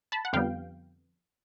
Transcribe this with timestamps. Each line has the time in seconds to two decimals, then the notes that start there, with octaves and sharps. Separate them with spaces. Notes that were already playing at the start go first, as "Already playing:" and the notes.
0.12 A5 B5
0.25 F#5
0.33 F2 D3 G3 B3 F5 G5